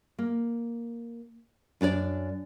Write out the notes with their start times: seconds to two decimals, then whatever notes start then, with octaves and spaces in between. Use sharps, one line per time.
0.19 A#3
1.81 F#2 D4 A4 D5